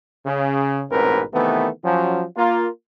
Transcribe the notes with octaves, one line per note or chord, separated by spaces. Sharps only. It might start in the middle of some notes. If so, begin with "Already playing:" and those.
C#3
A1 G#2 B2 C4 A#4 B4
C3 D#3 E3 A3 B3
F3 F#3 C#4
A#3 F4